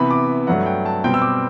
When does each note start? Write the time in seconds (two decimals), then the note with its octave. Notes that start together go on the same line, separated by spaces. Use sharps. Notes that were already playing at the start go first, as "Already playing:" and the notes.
Already playing: C3 E3 B3 B5
0.11 D6
0.47 G2 F#3 A3 F#5
0.66 G5
0.86 A5
1.04 B2 G3 C4 G5
1.14 E6
1.22 D6